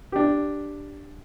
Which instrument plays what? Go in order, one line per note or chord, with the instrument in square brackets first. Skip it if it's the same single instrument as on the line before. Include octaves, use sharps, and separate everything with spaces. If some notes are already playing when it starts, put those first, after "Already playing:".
[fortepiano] D4 G4